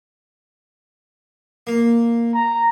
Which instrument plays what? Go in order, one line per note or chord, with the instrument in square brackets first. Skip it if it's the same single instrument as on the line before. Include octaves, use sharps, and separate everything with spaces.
[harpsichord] A#3
[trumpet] A#5